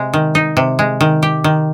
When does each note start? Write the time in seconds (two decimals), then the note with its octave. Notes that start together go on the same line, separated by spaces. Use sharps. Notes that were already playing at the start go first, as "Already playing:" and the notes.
Already playing: C3 G#3
0.14 D#3
0.35 D#4
0.57 C3
0.79 G#3
1.01 D#3
1.23 G4
1.44 D#3